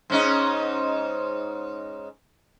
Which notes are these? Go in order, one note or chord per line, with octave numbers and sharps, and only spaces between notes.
G#2 C#4 D#4